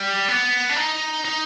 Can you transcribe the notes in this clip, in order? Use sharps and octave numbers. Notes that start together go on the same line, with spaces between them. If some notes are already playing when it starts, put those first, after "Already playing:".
Already playing: G3
B3
D4
D#4
D#4